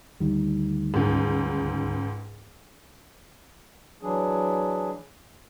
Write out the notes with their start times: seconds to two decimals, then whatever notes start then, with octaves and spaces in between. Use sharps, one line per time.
0.20 D2 D#3 G3
0.94 C#2 G#2
4.02 E3 F#3 D4 G#4